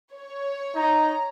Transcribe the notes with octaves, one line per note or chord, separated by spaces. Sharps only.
C#5
D#4 A#5